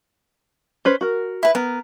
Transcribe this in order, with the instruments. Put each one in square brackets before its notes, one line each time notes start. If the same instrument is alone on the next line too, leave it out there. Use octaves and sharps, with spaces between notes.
[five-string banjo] C#4 B4 C5
F#4 A#4
[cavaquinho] E4 B4
[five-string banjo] B3 [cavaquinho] A#4